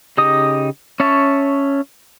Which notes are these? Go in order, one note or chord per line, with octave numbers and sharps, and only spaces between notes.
C#3 D#4 G4 D#5 D#6
C#4 C#5 E5 A5